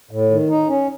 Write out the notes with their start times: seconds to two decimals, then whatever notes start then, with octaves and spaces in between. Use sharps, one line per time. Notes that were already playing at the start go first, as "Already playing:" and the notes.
0.11 A2
0.30 D#3
0.50 D#4
0.68 C#4